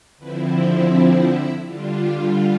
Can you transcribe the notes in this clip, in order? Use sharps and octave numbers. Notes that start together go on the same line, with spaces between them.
D3 F3 C4 E4 B4
G4 G5
F4 F5
E4 E5
D3 G3 D4 F4
D4 D5